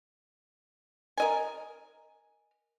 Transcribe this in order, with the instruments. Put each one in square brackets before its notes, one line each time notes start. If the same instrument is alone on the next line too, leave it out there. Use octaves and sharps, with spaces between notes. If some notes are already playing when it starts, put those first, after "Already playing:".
[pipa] A#4 D#5 G#5